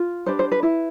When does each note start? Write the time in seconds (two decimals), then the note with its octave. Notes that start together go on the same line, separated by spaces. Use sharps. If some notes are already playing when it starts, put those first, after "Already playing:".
Already playing: F4
0.26 D4 G4 B4 C5
0.39 C5
0.52 B4
0.63 E4 B4